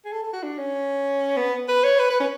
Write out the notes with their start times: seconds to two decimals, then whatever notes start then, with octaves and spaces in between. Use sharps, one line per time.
0.05 G#4
0.13 A4
0.23 A4
0.33 F#4
0.43 D4
0.59 C#4
1.37 B3
1.68 B4
1.84 C#5
1.99 B4
2.10 B4
2.20 C#4